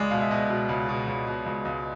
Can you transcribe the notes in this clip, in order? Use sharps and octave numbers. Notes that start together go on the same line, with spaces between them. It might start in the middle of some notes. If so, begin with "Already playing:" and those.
Already playing: C#2 G#3 D5
B2 F5
E5
B2 D#5
B2
C#2
B2
C#2
B2
C#2
C#2